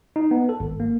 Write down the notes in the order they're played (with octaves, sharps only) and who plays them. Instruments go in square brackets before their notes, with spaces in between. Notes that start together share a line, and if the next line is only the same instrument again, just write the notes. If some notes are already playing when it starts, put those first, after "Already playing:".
[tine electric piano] D#4
B3
A4
G#1
A#3